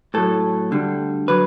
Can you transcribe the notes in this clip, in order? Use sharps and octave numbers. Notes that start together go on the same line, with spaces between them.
A2 F#3 A4
D2 D3 G3
D3 F#3 B4